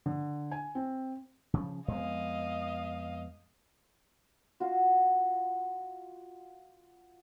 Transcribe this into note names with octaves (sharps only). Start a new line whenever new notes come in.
D3
G#5
C4
C#3 F3
F2 G#3 B3 D#5 F5
F4 F#4